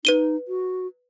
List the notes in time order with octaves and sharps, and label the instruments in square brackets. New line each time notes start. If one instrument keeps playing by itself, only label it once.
[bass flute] D#4 [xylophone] B4 D#7 G7
[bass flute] F#4